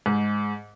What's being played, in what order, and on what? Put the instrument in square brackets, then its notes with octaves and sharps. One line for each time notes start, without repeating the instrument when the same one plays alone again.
[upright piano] G#2